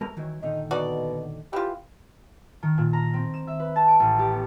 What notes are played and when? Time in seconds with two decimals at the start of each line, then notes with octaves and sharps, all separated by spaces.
0.01 A3 A#4 A#5
0.17 D#3 E3 F#3
0.43 A#2 D3 D#3 D#4
0.71 B2 D#4 F#4 D5
1.53 E3 F4 G4
2.63 D#3
2.78 A#2
2.93 A#5
3.13 C4
3.34 E7
3.47 E5
3.60 B4
3.76 A5
3.88 D7
4.00 A1
4.19 G4
4.32 B3